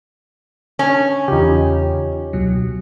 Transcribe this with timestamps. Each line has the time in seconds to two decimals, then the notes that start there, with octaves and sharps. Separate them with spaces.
0.79 C#4
1.28 E2 C#3 D#4 F4 G4
2.33 C#2 B2 F#3